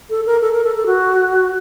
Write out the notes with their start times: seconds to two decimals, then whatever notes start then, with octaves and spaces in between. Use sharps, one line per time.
0.10 A4
0.26 A#4
0.41 A4
0.53 A#4
0.64 A4
0.76 A4
0.86 F#4